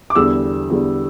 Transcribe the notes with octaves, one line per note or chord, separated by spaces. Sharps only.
D6
E2 D3 G3 E6
E2 D3 G3